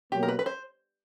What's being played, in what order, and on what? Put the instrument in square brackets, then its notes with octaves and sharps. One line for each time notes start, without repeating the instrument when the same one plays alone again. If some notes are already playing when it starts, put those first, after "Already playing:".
[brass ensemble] B2 F#3 A#3 [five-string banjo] G4
[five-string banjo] A#4
B4
B4
C5